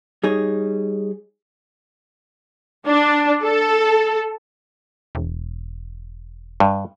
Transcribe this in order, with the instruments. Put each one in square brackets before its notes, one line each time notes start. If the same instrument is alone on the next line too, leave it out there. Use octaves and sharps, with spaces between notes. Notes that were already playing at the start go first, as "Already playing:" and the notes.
[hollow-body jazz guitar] G3 D#4 G#4 C#5
[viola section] D4
A4
[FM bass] E1
[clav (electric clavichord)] G2